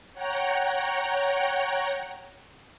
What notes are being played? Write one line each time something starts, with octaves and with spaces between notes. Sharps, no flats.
C#5 F#5 G5 A#5